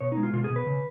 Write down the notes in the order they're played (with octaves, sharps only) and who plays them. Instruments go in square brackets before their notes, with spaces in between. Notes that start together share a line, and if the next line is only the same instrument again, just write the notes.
[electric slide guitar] B2 C#5
D#4
G#3
F4
B2 F4
G#4
B2
B4
C#3